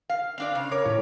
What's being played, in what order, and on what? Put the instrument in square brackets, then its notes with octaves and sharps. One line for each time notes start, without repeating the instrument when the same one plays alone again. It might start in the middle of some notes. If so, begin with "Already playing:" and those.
[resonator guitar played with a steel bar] F5
[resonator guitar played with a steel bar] C4 D4 D5 [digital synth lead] F5
[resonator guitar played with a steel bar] C#3
[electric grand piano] A#4 C#5 D6
[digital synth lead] A2 [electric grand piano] C#5